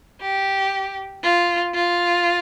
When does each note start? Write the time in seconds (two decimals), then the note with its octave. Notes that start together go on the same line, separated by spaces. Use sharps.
0.21 G4
1.23 F4
1.74 F4